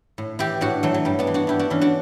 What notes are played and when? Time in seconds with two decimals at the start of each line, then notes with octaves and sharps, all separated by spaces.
0.18 A2
0.39 E3 E4 G4
0.61 A2 D4 F#4
0.83 E3 F#3 A3
0.94 F#3
1.05 G2 G3
1.19 B3 D4
1.27 E3
1.34 D4 F#4
1.47 G2 E4 G4
1.59 D4 F#4
1.70 E3 C#4 E4
1.81 D4 F#4